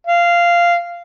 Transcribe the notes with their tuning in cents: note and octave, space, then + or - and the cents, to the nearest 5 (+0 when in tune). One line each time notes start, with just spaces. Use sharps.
F5 -10